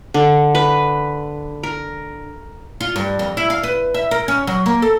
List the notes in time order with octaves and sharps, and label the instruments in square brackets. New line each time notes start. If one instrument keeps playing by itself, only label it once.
[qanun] D3
B4
A#4
[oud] F4
G2
F2
E4
F5
B4
E5
A#4
C#4
F#3
A#3
A4